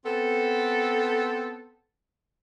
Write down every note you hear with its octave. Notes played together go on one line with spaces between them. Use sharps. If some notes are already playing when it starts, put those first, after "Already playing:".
B3 C4 A4